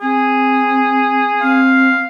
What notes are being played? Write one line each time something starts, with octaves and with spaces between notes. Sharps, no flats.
C4 G#4
C4 F5